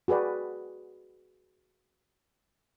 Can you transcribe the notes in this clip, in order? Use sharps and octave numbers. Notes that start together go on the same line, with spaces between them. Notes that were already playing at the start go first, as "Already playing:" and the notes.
F#4 G#4 B4 D5 G5